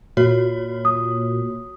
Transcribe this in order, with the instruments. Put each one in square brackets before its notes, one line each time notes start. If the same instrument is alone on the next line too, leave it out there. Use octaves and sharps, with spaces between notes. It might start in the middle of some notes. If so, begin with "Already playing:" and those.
[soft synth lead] A#2 [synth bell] F#4 C#5
[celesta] D#6